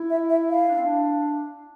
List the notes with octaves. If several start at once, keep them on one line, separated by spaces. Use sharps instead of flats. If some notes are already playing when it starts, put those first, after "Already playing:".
Already playing: E4
E5
E5
F5
D4
C4
D4